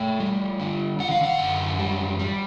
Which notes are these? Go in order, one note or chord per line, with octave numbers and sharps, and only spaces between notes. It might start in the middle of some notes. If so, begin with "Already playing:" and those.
Already playing: A3 G5
G3
D3
D3 F#5
F5
F#5
F#2
G3
G3